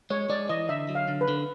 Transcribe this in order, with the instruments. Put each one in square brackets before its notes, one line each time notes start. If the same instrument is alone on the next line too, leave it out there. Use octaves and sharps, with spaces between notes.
[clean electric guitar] G#3 [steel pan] C#5
[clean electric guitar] G#3 [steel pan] D5
[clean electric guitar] E3 [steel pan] D#5
[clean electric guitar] D3 [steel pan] E5
[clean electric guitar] F#3
[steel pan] F5
[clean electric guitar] D3
[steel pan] B4
[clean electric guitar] D3